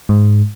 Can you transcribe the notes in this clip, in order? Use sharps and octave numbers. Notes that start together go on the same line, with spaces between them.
G#2